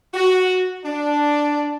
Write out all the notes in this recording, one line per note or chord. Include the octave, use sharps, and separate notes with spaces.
F#4
D4